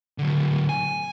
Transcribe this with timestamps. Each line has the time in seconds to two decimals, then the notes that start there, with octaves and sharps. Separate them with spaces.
0.18 D3 F#3
0.69 G#5